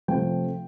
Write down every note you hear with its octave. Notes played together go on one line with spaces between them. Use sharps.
C3 F3 A3 G5